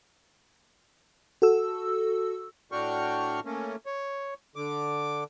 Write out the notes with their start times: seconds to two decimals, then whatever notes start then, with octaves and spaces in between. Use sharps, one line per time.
1.42 F#4 A4 E6
2.72 A2 D4 F#4 G5 C#6 F6
3.45 A3 A#3 C#4
3.86 C#5
4.56 D3 D6